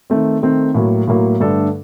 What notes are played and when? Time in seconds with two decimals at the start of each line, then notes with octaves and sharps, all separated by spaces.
0.10 D#3 A3 C4
0.42 D#3 A3 C4
0.75 A2 F#3 A#3
1.08 A2 F#3 A#3
1.40 G2 D3 A3 D4 A4